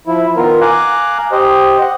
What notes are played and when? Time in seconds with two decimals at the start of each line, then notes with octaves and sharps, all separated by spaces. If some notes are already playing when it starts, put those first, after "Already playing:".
0.07 F3 E4
0.37 D#3 B3 F4 A#4
0.62 F5 G#5 A#5 D6 F#6
1.32 G4 C5 D#5
1.81 F#5